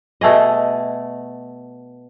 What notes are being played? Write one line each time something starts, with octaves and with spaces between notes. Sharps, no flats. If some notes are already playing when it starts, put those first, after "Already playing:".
B2 A3 G#4 D#5